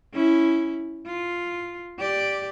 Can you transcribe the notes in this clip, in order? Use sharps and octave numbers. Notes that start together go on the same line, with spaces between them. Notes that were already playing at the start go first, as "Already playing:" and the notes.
C#4 E4
F4
G4 D5